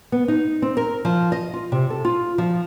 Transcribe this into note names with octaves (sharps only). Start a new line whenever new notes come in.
B3
D#4
C4
A#4
F3
D#5
F4
C3
A4
F4
F3